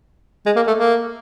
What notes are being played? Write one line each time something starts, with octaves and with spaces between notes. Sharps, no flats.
G#3
A#3
A3
A#3